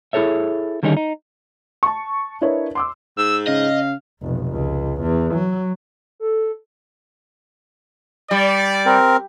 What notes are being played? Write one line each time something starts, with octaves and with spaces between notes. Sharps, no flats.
E4 G#4 A4 C#5 E5
D3 D#3 G3 C#4 D#4 G#4
D#4
A5 C#6
D4 E4 A#4 B4 C#5 D#5
C6 D6 E6
G#2 E6
C#3 D#5 F5
F1 B1
C#2
E2
F#3
A4
G3 D5
C4 A#4